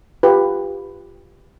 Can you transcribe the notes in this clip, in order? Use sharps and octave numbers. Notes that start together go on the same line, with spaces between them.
F4 G4 B4